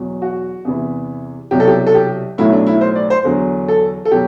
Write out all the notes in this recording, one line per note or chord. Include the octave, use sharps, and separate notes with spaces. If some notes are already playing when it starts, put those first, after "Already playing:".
Already playing: E2 B2 F#3
F#4
E2 C3 E3
C2 B2 F#3 G4
A4
G4
A4
G4
B1 A2 F#3 E4
D4
E4
C5
D5
C5
E2 D3 F#3
A4
A4
B2 F#3 G4